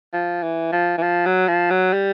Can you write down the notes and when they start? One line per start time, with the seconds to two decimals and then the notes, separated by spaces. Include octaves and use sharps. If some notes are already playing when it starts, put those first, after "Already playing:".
0.13 F3
0.43 E3
0.72 F3
0.98 E3
1.02 F3
1.26 F#3
1.48 F3
1.70 F#3
1.93 G3